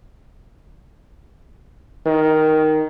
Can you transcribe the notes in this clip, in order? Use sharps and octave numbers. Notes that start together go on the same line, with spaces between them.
D#3